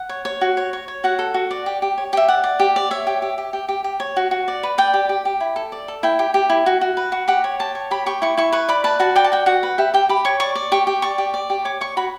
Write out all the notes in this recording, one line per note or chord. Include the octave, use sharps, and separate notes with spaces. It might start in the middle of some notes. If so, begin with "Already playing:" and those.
Already playing: F#5
C#5
C#5
F#4
C#5
C#5
C#5
F#4 F#5
A4
F#4
D5
G4
G4
C#5
G4 E5
D5 F#5
D5
G4
D5
C#5 E5
G4
G4
G4
G4
G4
G4
C#5
F#4
F#4
D5
B4
D5 G5
G4
G4
G4
E4
A4
D5
A4
E4 G5
G4
G4
E4
F#4
F#4
B4
F#4
G4 F#5
C#5
G4 A5
C#5
G4 B5
G4 C#6
E4 C#6
E4 C#6
B4 C#6
D5 B5
B4 A5
F#4 A5
D5 G5
A5
F#4 G5
F#4 F#5
B4
G4 E5
G4 G5
G4 B5
C#5 C#6
D5 C#6
D5
G4 C#6
G4
D5 C#6
G4
D5
G4
C#5 D6
C#5 C#6
F#4 B5